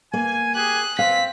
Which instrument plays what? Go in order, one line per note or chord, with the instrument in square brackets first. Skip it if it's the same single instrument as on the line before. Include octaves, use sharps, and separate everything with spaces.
[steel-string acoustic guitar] A#3 [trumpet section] G#5
[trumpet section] G4 G#4 G#5 [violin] F#6
[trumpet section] C4 [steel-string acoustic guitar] F5 [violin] B6